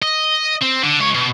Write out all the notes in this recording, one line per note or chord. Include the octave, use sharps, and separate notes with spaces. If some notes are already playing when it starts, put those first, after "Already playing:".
D#5
C4
D3
C#2 C#5
B2